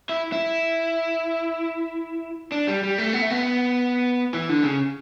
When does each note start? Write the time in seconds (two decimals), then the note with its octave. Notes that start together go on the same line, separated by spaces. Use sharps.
0.09 E4
0.32 E4
2.52 D4
2.68 G3
2.83 G3
2.98 A3
3.13 B3
3.22 A3
3.30 B3
4.34 E3
4.49 D3
4.64 C#3